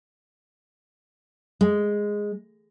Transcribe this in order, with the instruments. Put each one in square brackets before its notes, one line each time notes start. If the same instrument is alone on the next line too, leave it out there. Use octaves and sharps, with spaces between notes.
[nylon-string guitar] G#3